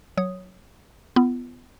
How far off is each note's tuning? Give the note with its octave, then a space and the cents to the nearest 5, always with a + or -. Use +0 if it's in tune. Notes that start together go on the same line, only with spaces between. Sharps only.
F#3 +0 C#5 +0 D#6 +0
B3 +15 F4 -30